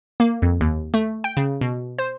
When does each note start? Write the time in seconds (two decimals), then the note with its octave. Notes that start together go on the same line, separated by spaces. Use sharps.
0.20 A#3
0.42 F2
0.61 D#2
0.94 A3
1.24 G5
1.37 C#3
1.61 B2
1.99 C5